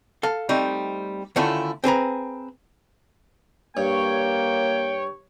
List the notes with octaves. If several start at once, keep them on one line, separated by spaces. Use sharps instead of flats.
A4 F5
G3 A3 C4 D#4
D3 D#3 A3 C#4 E4 F4
C4 G#4 B4 A#5
G2 A#3 C#5 G5